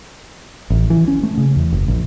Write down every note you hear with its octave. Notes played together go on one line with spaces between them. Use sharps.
A1
E3
C#4
A3
C#3
E2
F#1
A#1